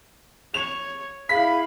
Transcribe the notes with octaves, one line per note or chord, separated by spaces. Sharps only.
C#5 F7
E4 G#4 F5 B5 B6